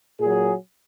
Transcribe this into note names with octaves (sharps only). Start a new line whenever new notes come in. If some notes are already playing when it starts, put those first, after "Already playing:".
A#2 F#3 G#4